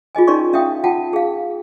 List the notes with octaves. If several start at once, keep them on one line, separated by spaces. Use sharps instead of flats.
F4 G#4 D#5 G#5
C#4 D#4 A#4 D5 C6 C#6
C#4 E5 F5 G5 D#6
F4 F#5 G5 A5
G#4 F5